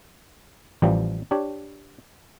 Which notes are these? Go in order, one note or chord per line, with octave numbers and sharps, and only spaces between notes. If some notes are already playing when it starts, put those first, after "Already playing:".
A1 E3 F3 G3 G5
D4 G4 C#5